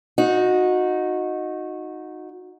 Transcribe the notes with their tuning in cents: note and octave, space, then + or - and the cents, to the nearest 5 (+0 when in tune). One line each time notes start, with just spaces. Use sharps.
D#4 +0 F#4 -20